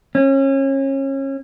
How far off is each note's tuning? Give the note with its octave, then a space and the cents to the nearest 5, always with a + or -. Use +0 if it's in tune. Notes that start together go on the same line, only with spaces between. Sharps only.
C#4 -30